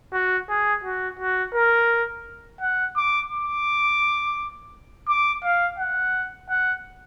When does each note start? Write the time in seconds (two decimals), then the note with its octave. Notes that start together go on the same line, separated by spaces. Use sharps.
0.13 F#4
0.50 G#4
0.84 F#4
1.20 F#4
1.54 A#4
2.61 F#5
2.97 D6
3.31 D6
5.09 D6
5.44 F5
5.79 F#5
6.50 F#5